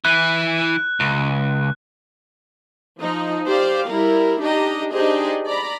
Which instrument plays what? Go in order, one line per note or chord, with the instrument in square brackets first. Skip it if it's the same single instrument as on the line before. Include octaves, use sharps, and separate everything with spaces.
[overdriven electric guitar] E3 E4 [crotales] F#6
[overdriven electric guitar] C#2
[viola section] F3 D#4
G4 C5 D5 F5
G3 E4 A#4
D4 D#4 G4 D#5 A#5
D4 D#4 G4 G#4 C5 D#5
D5 A#5 B5